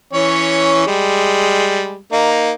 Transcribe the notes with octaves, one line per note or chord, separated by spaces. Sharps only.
E3 C#4 C#5
G3 G#3
A#3 D#4